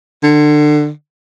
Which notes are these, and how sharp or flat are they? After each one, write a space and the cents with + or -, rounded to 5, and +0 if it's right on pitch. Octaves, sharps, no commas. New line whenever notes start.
D3 +25